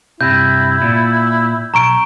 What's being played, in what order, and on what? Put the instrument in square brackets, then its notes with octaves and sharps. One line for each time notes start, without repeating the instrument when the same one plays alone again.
[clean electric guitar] G2 C3 [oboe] E4 [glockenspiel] G6
[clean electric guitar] A#2
[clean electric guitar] B1 [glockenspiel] A#5 C#6 D7